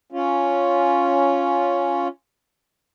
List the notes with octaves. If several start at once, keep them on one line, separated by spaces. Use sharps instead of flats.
C#4 F4